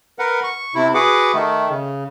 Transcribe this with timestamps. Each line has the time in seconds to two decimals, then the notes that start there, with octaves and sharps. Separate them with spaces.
0.19 A#4 B4 F#5
0.44 C#6
0.75 C3 E4
0.94 F#4 G#4 B4 F#5 D6
1.34 D#3 A3
1.69 C#3